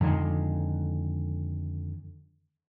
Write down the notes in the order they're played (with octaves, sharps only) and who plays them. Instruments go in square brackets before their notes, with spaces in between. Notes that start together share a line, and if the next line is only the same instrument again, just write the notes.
[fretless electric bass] F2 D3 D#3 G#3